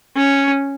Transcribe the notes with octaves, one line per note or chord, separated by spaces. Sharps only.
C#4